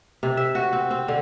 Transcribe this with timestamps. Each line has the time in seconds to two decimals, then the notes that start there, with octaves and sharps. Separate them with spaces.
0.23 C3
0.37 E5
0.55 F#4
0.73 C4
0.91 C4
1.08 D3